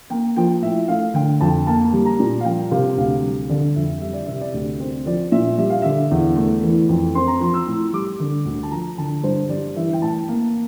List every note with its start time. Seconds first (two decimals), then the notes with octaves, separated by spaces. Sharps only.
0.10 A#3 G5
0.36 F3 G5
0.62 A2 E5
0.88 A3 F5
1.14 D3 G5
1.40 F2 A5
1.67 A#3 A5
1.93 G3
2.05 A#5
2.20 A#2
2.41 F5
2.44 F3 G5
2.71 C3 F5
2.97 D2 F5
3.23 G3
3.50 D3 D5
3.76 F2 E5
4.01 G3 E5
4.13 D5
4.26 C3 E5
4.41 D5
4.54 D2
4.79 C4
5.06 F3 D5
5.32 A#2 E5
5.58 G3 E5
5.70 F5
5.82 D3 E5
6.11 E2
6.36 A3
6.63 E3
6.89 F2
7.15 C4 C6
7.27 A#5
7.40 F3 C6
7.54 E6
7.67 A2
7.93 G3 D6
8.20 D3
8.45 D2
8.63 A5
8.71 F3 A#5
8.98 D3 A5
9.23 G2 C5
9.49 G3 D5
9.76 E3 E5
9.93 G5
10.02 A2 A5
10.28 A#3